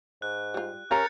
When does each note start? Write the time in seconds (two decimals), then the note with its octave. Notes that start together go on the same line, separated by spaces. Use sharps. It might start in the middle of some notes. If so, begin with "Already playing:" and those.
0.22 G#2 F#6
0.54 G3 F4
0.91 C#4 G4 A#4 F5 A#5 G6 A6 C#7